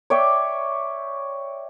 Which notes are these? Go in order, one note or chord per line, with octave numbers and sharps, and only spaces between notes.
C#5 D5 E5 G5